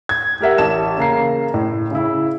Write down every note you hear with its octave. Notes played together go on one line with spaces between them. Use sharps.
G#6
G4 A#4 E5 F#5
A1 A5 E7
C#3 A#3 A#5 C7
A2
C#3 E4